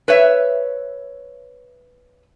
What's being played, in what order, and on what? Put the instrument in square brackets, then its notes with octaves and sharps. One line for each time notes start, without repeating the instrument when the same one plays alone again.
[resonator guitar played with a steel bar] B4 C#5 E5